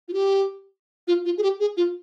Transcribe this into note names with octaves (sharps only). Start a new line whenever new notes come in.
F4
G4
F4
F4
G#4
G4
G#4
F4